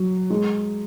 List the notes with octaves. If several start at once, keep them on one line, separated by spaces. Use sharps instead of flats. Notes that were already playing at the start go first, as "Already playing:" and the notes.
Already playing: F#3
G#3